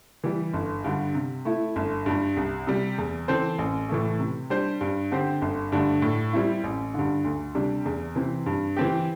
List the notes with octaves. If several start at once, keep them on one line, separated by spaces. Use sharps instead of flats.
E3 G3
G1
G2 D3 G3
C3
A3 E4
G1
G2 G3
C2
C3 G3
E2
E3 C4 A4 C5
A1
A2 E3 A3
C3
G3 D4 C5
G2
D3 C4 G4 C5
G1
G2 D3 A3 D4
A2
G3 C4 E4
A1
G2 D3
D2
C3 G3 D4
E2
C3 E3 C4
G2
E3 C4 G4